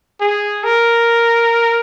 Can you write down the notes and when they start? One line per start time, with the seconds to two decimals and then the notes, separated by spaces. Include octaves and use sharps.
0.20 G#4
0.64 A#4